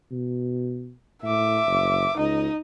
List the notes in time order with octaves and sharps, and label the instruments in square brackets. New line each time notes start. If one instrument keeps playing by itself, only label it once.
[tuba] B2
[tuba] A2 [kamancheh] E5 D6
[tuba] F#1
[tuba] C#2 [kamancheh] D#4 D#5